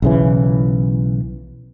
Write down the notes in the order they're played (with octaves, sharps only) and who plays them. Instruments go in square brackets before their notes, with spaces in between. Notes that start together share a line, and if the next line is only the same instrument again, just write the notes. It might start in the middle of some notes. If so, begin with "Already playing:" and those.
[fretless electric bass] B1 C#3 E3